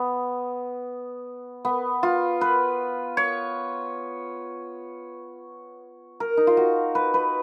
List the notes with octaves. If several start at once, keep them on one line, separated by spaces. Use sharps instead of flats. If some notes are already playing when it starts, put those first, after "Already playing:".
Already playing: B3
B3
F4
B4
C#5
A#4
D#4
F4
F#4
B4
B4